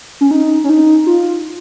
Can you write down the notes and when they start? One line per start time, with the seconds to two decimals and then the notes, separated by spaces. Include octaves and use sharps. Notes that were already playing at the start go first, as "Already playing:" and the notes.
0.21 C#4
0.31 D#4
0.64 C#4
0.69 D#4
1.07 F4